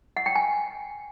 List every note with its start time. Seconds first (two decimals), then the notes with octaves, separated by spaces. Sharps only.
0.17 F#5
0.26 G5
0.36 G#5